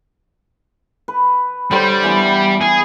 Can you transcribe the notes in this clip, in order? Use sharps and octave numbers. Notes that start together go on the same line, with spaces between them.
B4
D3 G3 C5 C#5
E3 B3
G#4